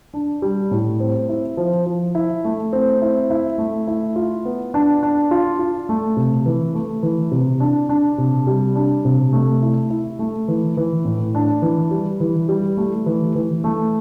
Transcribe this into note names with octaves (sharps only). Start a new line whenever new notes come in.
D4
G3
A2
C4
E4
F3
F3
E4
A3
C4
E4
E4
A3
E4
F4
B3
D4
D4
F4
F4
A3
C3
E3
A3
E3
C3
D4
D4
C3
G3
D4
C3
A3
E4
E4
A3
E3
E3
A2
D4
E3
G3
E3
G3
A3
E3
E3
A3